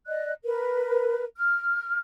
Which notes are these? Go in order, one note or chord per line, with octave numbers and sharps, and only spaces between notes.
D5 D#5 F#6
A#4 B4
F6